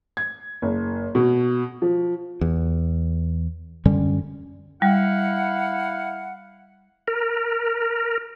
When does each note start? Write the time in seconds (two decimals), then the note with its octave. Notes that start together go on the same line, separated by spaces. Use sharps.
0.17 G#6
0.62 F#1
1.15 B2
1.82 F3
2.41 E2
3.85 F#2 D3 G3 C#4
4.82 G3 E4 F5 F#5
7.08 A#4